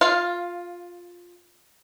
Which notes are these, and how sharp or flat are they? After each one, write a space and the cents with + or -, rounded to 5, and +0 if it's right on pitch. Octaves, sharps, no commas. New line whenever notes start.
F4 +10 F5 -10